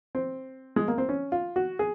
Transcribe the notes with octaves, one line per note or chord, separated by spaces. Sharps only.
C4
G#3
A#3
C4
C#4
F4
F#4
G#4